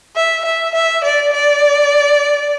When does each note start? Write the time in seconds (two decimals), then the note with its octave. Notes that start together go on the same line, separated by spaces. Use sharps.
0.16 E5
0.45 E5
0.75 E5
1.04 D5
1.33 D5